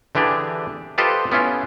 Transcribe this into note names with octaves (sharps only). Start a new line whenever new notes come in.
D3 E3 D4 G4 G#4
F4 G4 A4 B4 C5 D#5
B3 C#4 E4 F4